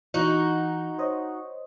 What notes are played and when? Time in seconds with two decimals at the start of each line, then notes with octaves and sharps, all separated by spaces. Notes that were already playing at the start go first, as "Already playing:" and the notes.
0.14 E3 D#4 F#4
0.99 C5 C#5 D#5